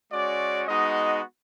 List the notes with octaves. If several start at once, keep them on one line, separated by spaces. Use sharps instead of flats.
G#3 C#4 F#4 D5
G#3 B3 D#4 F#4 D#5